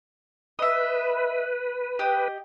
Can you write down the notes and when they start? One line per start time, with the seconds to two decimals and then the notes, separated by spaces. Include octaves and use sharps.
0.59 B4 D#5 E5
1.99 G4 D#5